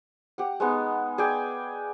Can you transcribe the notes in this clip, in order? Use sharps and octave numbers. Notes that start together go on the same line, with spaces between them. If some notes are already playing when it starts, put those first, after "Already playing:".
G4 F#5
G#3 B3 D#4
G#4 D5 G5 G#5